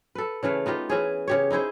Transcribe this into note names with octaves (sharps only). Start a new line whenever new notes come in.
A4 B4
C#3 E3 A3 F5
B3 D#4 F4 G4
E3 C#4 G#4
C#3 G4 C#5
D#4 E4 G#4 C5